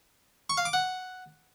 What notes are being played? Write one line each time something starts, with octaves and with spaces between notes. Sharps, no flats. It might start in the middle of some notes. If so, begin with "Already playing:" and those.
C#6
F5
D6
F#5